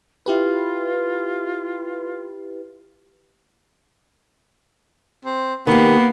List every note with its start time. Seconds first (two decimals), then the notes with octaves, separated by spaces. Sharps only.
0.26 E4 F4 G4 B4
5.25 C4
5.67 D#3 A#3 B3 G4